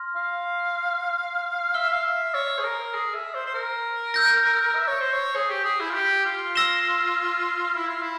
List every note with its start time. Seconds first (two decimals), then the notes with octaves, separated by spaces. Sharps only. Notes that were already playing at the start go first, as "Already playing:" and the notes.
Already playing: C6 F6 A#6
0.16 F5
1.74 E5 F6 C7 G7
1.93 F5
2.04 E5
2.34 C#5
2.59 G#4
2.64 A#4
2.94 G#4
3.15 E5
3.35 C5
3.46 C5
3.54 A#4
4.14 E6 G6 A#6
4.75 E5
4.88 C#5
5.01 C5
5.13 C#5
5.36 G#4
5.50 G4
5.65 G#4
5.80 E4
5.90 F4
5.95 G4
6.26 F4
6.55 E6 A#6 E7 G7
7.76 E4
7.89 F4
8.02 E4